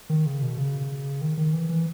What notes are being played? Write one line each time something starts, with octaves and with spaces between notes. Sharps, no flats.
D#3
C#3
B2
C#3
D#3
D#3
E3
E3